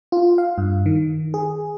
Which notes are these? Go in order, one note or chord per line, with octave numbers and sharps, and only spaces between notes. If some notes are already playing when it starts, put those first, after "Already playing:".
F4
F5
G2
D#3
G#4